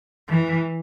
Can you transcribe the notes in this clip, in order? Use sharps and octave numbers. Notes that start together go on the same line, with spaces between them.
E3